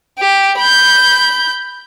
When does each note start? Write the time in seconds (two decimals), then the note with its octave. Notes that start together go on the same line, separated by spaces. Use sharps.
0.19 G4
0.59 B5 G6